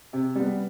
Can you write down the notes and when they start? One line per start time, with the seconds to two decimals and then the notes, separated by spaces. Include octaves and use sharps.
0.13 C3
0.35 G3 B3